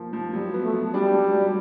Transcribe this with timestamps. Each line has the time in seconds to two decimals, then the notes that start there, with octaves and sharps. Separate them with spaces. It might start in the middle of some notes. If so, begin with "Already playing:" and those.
Already playing: F3 A#3
0.13 F3
0.33 F#3 G3
0.54 B3
0.64 A3
0.74 F#3
0.94 G3 D4
1.14 F#3
1.34 F#3